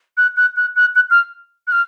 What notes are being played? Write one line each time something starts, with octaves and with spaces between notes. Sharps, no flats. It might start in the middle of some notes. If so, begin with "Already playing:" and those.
F#6
F#6
F#6
F#6
F#6
F6
F#6
F6